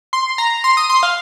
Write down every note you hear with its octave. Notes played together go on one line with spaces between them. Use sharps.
C6
A#5
C6
D#6
C6
F5